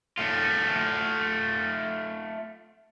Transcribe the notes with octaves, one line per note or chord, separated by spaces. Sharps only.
A3 F4